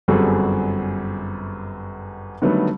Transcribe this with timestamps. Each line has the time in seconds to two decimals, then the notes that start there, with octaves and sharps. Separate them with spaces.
0.08 G1 F#2 G3 C4 G#4 A4
2.42 D3 D#3 F#3 G3 A3 B3